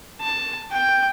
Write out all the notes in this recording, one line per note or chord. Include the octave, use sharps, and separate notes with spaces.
A5
G5